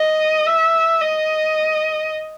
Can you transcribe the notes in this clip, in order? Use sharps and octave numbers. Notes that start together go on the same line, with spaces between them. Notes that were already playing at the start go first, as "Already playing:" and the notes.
Already playing: D#5
E5
D#5